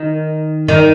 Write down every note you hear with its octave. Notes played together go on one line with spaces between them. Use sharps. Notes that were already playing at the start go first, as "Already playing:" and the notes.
Already playing: D#3
D#3